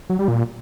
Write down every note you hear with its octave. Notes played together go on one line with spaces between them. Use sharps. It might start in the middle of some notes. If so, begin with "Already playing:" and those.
F#3
G3
A#2